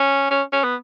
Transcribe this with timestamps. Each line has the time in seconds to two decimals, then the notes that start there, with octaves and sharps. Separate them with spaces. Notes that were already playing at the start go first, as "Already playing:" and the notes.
Already playing: C#4
0.30 C#4
0.52 C#4
0.64 B3